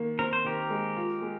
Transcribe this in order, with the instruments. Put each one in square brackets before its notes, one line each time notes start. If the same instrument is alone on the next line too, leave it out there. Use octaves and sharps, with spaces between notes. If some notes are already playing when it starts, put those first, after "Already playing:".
Already playing: [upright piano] D#3 A#3
[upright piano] C4 [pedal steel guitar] A#4
[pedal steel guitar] C5
[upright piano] D#3 [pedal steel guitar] G4 A#4
[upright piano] G#3
F4
G#3